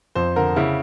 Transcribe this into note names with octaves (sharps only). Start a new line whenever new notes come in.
F2 C5
D3 A#4
C#3 E4